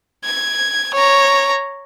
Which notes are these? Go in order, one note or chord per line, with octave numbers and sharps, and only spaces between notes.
G#6
C#5 A#5